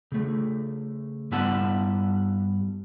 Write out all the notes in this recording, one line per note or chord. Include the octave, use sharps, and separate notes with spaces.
C#3 A3
G2 G3 B3 E4 F#5 A5